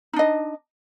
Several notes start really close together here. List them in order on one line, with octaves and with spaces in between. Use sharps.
D#4 D4 D#5